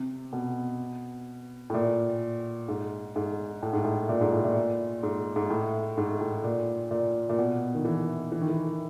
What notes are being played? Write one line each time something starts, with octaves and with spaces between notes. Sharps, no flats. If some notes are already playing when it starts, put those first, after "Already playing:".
Already playing: C3
B2
A2
A#2
G#2
G#2
A2
G#2
A2
A#2
G#2
A2
A#2
G#2
G#2
A2
G#2
A2
A#2
A#2
A#2
B2
D#3
E3
E3
D#3
E3